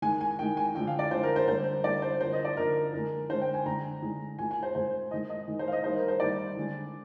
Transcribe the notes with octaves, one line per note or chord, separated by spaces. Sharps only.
D#3 G#3 G#5
G#5
D#3 G#3 G5
G#5
D3 F3 G#3 G5
F5
D5
D3 F3 G#3 C5
A#4
C5
D3 G3 A#3 C5
D3 G3 A#3 D5
C5
D3 F3 A#3 C5
D#5
D5
D3 F3 A#3 A#4
D3 G#3 A#4
D3 G#3 C5
G5
G#5
D3 G#3 A#5
D3 G#3
A#2 G#3 G#5
G#5
C5
A#2 G#3 C5
D#3 G#3 D#5
D#5
D#3 G#3
C5
F5
D#5
D#3 G3 A#3 C5
A#4
C5
D#3 G3 A#3 D5
D3 G#3